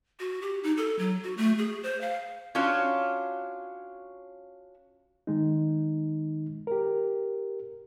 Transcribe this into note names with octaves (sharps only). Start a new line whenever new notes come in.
F#4
G4
D#4
A4
F#3
F#4
A3
G#4
C5
F5
C#4 D4 F4 F#4 C#5
D#3 G#3 D#4
G4 A#4